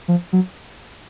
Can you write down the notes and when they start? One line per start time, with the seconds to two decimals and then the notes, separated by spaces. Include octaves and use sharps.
0.08 F3
0.33 F#3